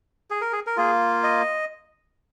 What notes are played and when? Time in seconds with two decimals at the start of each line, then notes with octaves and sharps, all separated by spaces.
0.31 G#4
0.41 A#4
0.53 G#4
0.67 A#4
0.77 A#3 F4 G#4
1.23 D#5